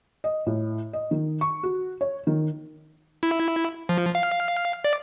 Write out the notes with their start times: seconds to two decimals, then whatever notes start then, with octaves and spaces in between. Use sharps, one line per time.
0.24 D#5
0.46 A2
0.93 D#5
1.11 D#3
1.41 C#6
1.63 F#4
2.01 C#5
2.27 D#3
3.23 E4
3.89 F3
4.15 F5
4.85 D5